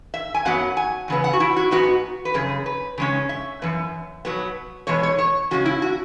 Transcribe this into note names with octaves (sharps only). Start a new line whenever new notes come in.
E5
G#5
F#2 F#3 B3 F#5
G#5
E2 C#3 B3
F#5
F#4
E4
F#4
G#2 G#3 B3 F#4
B4
F#2 C#3 G#4
B4
C#3 G#3 C#4
E5
F#2 E3 B3
B2 F#3 B3
E2 B2 G#3 B3 C#5
C#5
C#5
C#3 G#3 C#4 F#4
E4
F#4